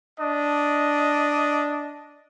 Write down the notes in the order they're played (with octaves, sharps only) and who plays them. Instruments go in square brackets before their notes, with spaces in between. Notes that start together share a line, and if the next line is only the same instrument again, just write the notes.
[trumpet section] D4 D#5